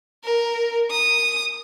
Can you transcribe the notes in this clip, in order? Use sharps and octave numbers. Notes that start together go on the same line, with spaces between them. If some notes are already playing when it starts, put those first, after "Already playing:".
A#4
D#6